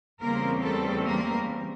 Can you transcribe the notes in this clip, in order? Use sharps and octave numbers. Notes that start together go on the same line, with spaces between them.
E2 C#3 E3 G3 A#3 C4 A#4
A3 A4
A#3 A#4